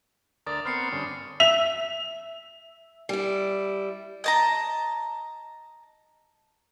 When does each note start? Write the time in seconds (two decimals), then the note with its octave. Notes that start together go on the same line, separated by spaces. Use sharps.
0.47 D2 A#4 D5 D6 D#6 A6
0.65 B3 C4 A#4 F6 C7 C#7
0.92 G2 D3 C#4
1.40 E5 F7
3.09 G3 E4
4.24 D#5 A5 A#5